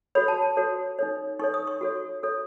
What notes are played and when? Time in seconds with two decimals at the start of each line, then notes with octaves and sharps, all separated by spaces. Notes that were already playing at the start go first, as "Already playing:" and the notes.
0.15 F#4 A4 C#5 B5
0.28 A5
0.42 A5
0.57 F#4 A4 C#5
0.99 D#4 A4 C#5
1.39 D#4 A4 C#5 C#6
1.54 D#6
1.67 C#6
1.81 F#4 A4 C#5
2.22 F#4 A4 C#5